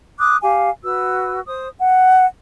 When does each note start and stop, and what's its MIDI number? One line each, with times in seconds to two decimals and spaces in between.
0.19 0.36 86
0.19 0.36 87
0.19 0.36 90
0.42 0.68 67
0.42 0.68 77
0.42 0.68 80
0.82 1.39 66
0.82 1.39 71
0.82 1.39 88
1.46 1.68 72
1.46 1.68 87
1.77 2.25 78